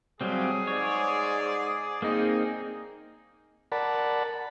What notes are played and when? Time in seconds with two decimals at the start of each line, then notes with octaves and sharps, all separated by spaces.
0.21 F#3 G3 A3 C4 E4 G#4 F5
0.67 G#2 C#5 D5
2.02 A#3 C4 D#4 G#4 D#5
3.72 A#4 D5 F#5 A5 B5